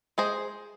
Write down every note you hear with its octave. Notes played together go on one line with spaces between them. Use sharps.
G#3 G#4 C5